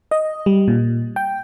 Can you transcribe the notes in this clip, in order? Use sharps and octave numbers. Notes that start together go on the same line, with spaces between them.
D#5
G3
A#2
G5